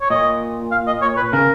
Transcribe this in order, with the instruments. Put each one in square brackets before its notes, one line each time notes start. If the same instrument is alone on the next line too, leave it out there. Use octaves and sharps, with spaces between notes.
[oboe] C#5
[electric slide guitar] A#2 [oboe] D#5
[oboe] F5
D#5
C#5
B4
[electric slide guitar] C#3 [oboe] A#4